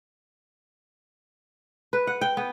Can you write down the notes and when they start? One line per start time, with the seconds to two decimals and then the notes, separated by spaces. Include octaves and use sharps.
1.93 B4
2.07 F#5
2.21 G5
2.37 B3